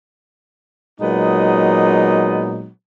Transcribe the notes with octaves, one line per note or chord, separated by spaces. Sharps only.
A#2 F#3 G#3 B3 D#4